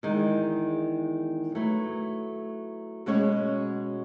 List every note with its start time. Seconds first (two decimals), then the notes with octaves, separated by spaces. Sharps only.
0.03 E2 D#3 G#3
1.55 F#3 A3 E4 B4
3.06 B2 G#3 C#4 F#4 C#5